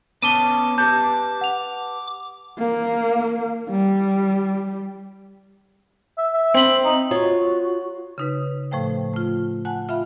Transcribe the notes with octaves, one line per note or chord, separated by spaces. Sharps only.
B3 C#4 A5 D6 D#7 G7
G4 B4 A5 G6
F#5 F7
A#3
G3
E5
E5
C4 B5
D#4
F4 F#4 C#5
C#3 D#4 B4
A2 F3 A3 C5 G5
A3 F4
F#5 G#5 A5 F#6
F4 E5 F5 B5